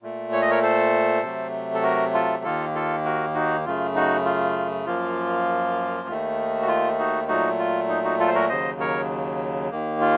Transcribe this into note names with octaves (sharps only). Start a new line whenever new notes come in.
A#2 A3
C#5
D#5
A#4 C#5
A4 C5
C3 F#3 A3
A4
F#4 A#4
F4 A4
D#2 D#3 A#3 F4 A4
F4 A4
F#4 A#4
D#4 F#4
F#2 C#3 A3 F4
D#4 F#4
F4
F#2 F3 A#3 F4
D#2 D#3 A3
F#4
F4
D#4 F#4
A#2 F#3 A3 D#4 F#4
F4
D#4
D#4 F#4
F4 A4
C5
F#4 A#4
D#2 C#3 F#3 C5 D#5
A#4 C#5
D#2 D#3 A#3
F4